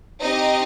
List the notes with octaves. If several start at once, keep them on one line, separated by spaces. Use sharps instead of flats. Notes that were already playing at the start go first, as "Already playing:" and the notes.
C4 D#4 G4 D#5